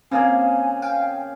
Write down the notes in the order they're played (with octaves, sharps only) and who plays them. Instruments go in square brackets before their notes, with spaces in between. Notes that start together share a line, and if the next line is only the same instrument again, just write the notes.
[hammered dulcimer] C#3 A#3 G#4 [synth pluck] C4 [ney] G#5
[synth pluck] F5 G5